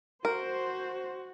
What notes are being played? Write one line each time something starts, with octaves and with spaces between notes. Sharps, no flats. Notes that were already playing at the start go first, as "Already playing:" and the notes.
F#4 A#4 C5